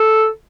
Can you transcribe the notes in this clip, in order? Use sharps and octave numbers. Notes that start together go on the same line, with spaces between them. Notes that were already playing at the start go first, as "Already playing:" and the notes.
Already playing: A4